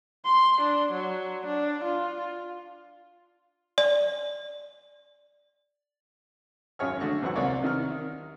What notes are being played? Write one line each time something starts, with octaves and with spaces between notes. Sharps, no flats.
C6
D4
F#3
D4
F4
D5
G#1 F#2 G#4 C#5 F6
D3 A3 F#4 C#6
E2 G#2 E3 F#3 F#5 C#6
C2 A#3 C4 C#5 D5
C3 D#3 A#4 F6